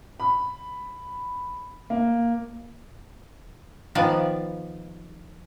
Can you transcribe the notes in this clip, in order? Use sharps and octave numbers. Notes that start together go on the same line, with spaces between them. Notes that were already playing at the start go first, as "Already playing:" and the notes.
B5
A#3
D#3 F3 B3 D5 G#5